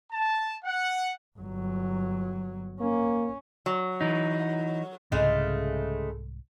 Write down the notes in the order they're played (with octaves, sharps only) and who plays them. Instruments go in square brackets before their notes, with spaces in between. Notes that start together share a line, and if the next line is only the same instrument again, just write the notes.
[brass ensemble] A5
F#5
[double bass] G1 F#3
[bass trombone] A#3 [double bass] C#4
[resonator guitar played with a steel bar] F#3
[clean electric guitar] E3 D#4
[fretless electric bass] C2 G#2 [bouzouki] C#3 G#3 A3